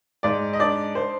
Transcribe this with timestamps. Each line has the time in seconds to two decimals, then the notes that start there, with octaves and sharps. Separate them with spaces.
0.23 G#2 D5
0.53 D#5
0.60 D4 D5
0.95 C5